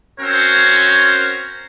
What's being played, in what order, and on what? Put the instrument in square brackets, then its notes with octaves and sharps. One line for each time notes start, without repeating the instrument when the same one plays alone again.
[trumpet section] C4 C#4 F#4 A#4 C5 C#5